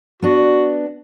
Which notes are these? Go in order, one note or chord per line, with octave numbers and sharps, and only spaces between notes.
B3 D4 F#4